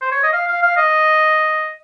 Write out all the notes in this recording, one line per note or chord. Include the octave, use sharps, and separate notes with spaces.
C5
C#5
D#5
F5
F5
F5
D#5